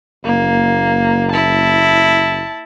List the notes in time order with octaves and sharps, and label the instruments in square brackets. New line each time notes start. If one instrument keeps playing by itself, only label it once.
[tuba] F#1 [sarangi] A#3
[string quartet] E4 [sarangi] A5